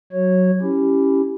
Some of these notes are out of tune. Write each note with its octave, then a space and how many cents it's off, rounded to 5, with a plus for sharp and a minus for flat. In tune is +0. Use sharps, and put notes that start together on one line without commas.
F#3 +0 F#4 +0 C#5 -15
C#4 +0 E4 +0 G4 +0